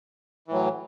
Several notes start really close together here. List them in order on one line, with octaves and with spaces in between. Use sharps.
E3 A2 F#3